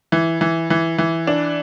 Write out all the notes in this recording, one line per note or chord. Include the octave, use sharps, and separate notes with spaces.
E3
E3
E3
E3
D4